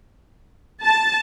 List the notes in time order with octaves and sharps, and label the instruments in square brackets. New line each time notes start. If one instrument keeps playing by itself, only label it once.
[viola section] A5